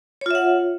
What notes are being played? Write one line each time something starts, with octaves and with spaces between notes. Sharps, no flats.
F4 C#5 E5 F#5